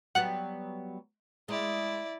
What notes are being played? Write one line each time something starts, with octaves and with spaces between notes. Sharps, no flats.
F#3 G3 B3 F#5 F#6
G#3 E4 D5